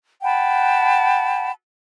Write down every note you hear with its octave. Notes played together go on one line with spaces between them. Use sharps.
F#5 G5 A5 B5